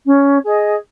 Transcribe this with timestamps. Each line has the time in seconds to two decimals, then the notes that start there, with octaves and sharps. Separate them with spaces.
0.06 C#4
0.43 G#4 D#5